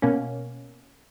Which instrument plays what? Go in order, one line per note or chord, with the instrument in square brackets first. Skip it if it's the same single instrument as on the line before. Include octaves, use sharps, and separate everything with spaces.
[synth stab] B2 A#3 C#4